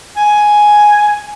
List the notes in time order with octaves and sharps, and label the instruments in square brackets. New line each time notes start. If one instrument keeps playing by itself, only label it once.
[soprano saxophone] G#5